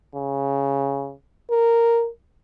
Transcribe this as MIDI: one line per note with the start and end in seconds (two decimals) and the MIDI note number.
0.15 1.13 49
1.51 2.09 70